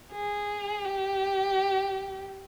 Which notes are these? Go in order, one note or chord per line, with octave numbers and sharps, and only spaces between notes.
G#4
G4